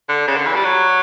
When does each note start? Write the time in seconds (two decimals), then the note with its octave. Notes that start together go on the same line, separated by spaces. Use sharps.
0.09 D3
0.27 C#3
0.37 D3
0.46 E3
0.55 G3
0.64 F#3